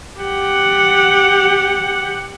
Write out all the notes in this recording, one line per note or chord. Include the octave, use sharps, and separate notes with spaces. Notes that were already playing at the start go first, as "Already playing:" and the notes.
G4 F#5